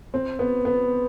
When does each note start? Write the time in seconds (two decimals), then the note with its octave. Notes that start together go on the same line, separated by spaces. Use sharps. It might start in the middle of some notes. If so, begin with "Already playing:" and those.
0.14 C4
0.39 B3
0.65 B3